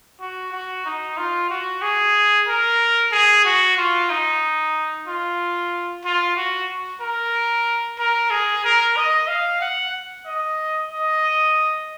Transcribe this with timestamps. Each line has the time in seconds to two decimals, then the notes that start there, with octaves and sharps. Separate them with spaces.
0.21 F#4
0.52 F#4
0.85 D#4
1.17 F4
1.50 F#4
1.82 G#4
2.48 A#4
3.12 G#4
3.45 F#4
3.78 F4
4.10 D#4
5.07 F4
6.05 F4
6.37 F#4
7.01 A#4
7.99 A#4
8.31 G#4
8.64 A#4
8.97 D#5
9.28 F5
9.61 F#5
10.26 D#5
10.91 D#5